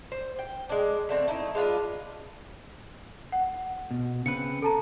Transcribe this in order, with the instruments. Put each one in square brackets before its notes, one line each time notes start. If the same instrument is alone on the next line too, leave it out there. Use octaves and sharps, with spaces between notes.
[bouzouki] C5
G5
G#3 D4
D3 A3 C4
A3 D#4 E4
G#3 D4 F4 B4
[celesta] F#5
[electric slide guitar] B2
[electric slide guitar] C#3 C4 B4 [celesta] C#7
[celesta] A4 A5 A#5